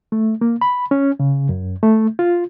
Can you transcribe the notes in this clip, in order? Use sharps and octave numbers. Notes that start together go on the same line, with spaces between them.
A3
A#3
B5
C#4
C#3
F#2
A3
F4